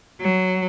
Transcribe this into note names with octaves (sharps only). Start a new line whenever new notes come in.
F#3